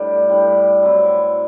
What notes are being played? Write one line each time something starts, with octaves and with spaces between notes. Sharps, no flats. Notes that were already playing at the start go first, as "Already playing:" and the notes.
Already playing: A2 G3 D4 G4
A2 G3 D4 G4
F#3 C4 E4